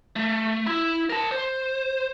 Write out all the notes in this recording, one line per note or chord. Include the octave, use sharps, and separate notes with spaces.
A3
E4
A#4 A5
C5